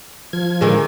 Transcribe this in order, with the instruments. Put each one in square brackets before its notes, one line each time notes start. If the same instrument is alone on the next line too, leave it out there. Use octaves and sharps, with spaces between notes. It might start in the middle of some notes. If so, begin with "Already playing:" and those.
[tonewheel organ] F3 G#6
[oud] D3 D#3 G#3